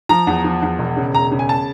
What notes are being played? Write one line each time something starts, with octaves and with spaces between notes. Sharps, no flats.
F3 A#5
E2
F3
E2
E1
C#3
E1 A#5
C#3
G#5
A5